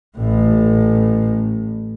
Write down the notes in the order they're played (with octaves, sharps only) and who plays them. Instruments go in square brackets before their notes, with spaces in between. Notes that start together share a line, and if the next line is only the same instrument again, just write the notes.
[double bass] A1 A2